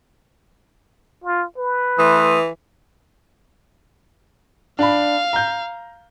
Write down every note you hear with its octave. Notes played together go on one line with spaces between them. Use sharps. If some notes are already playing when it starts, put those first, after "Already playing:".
F4
B4
E3 A3 C6 D#6
D4 F5 B5
A#5 G6